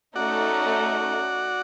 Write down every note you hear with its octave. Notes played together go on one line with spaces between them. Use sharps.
A3 C#4 D#4 F#4 D5 F#5